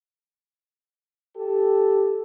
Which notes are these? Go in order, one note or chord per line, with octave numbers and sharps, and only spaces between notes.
G4 A4